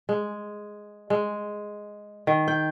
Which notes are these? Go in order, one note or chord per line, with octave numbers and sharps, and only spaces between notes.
G#3
G#3
D#3
G5